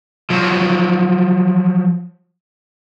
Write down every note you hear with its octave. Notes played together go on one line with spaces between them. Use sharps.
F3 F#3